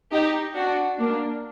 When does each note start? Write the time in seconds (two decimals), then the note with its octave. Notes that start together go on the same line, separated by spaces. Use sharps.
0.13 D#4 G4
0.56 D4 F#4
0.99 A#3 D4